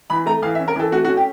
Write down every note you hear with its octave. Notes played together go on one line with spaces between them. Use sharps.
E3 B5
A3 A#5
E3 F5
E5
C#4
A#4
E3 A4
A3 F#4
F#4
C#4
G4